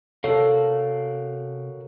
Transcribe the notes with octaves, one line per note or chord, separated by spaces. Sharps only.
C3 F#4 A4 A#4 C#5 F5